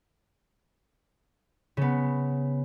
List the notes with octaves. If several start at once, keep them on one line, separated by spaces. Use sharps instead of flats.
C#3 B3